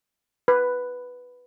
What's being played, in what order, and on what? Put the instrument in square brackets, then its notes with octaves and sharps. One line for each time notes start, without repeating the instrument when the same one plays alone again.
[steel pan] B4